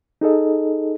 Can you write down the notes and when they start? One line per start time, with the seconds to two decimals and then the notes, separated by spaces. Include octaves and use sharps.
0.21 D#4 G#4 A4 D#5